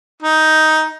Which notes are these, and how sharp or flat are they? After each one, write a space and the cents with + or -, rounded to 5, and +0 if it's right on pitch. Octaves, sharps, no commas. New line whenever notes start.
D#4 +10